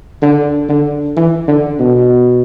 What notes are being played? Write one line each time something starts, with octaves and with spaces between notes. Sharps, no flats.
D3
D3
E3
D3
B2